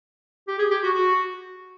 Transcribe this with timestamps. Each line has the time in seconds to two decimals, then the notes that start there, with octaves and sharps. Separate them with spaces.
0.48 G4
0.58 G#4
0.71 G4
0.83 F#4
0.94 F#4